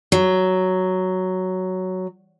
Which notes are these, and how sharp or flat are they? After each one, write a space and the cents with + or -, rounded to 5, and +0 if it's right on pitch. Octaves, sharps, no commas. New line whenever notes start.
F#3 +5